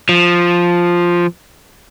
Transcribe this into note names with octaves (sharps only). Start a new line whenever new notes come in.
F3